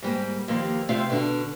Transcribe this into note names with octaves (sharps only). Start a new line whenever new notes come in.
G#2 G3 A#3
D#2 F3 A#3
C3 A3 C4 F4 F5
B2 D3